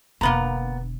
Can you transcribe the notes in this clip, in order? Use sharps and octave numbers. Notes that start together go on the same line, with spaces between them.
E1 D3 A#3 B3 A#5